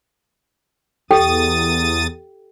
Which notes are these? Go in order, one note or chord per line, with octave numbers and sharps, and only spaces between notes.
E2 G4 A4 G5 D#6 A6